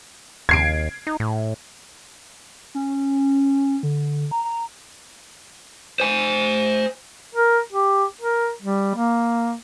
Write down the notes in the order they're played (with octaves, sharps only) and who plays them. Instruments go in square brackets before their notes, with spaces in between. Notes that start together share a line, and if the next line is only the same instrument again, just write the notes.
[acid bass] D#2 [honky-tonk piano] G#6 C7 D7
[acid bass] D#4
A2
[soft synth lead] C#4
D3
A#5
A#5
[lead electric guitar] C5 G#5
[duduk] A#4
G4
A#4
G3
A#3